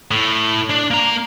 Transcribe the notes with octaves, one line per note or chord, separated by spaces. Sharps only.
A2
D4
A#3 A#5